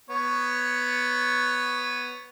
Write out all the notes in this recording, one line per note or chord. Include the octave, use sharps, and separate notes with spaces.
B3 C#5